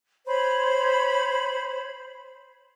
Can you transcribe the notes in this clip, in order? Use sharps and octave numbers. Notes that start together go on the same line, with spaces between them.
C5 C#5 B5